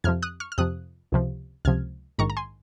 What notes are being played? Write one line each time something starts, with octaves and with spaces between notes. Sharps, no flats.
F2 C3 F3 F6 G#6
D#6 F#6
C#6 F6
F6
F2 C3 F3 D#6 F#6
C#2 C3 F3
C#2 C3 F3 F6 G#6
A#1 G#2 D#3 A#5 C#6
A#5
G#5 C6